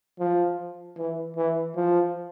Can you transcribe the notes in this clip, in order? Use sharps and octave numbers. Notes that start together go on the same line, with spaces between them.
F3
E3
E3
F3